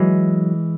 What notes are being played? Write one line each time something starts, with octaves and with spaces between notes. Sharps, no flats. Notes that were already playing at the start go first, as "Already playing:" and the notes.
Already playing: E3 F#3 G#3